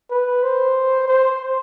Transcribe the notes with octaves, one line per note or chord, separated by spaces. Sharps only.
B4
C5
C5